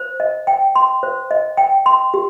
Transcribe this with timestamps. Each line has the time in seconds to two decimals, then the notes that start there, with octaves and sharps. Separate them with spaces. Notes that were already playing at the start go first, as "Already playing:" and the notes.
Already playing: C5
0.20 D#5
0.47 G5
0.76 C6
1.03 C5
1.31 D#5
1.57 G5
1.86 C6
2.14 G4